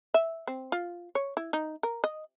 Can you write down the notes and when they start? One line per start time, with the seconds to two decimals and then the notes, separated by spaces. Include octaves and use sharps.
0.14 E5
0.47 C4
0.72 F4
1.15 C#5
1.37 E4
1.53 D#4
1.83 A#4
2.04 D#5